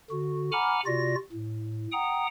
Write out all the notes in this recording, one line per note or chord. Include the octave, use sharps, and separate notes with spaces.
D3 F#4
F#5 G#5 A#5 B5 D6 F6
C3 F4 F#4 D5 A#6
A2
F#5 G5 A#5 D#6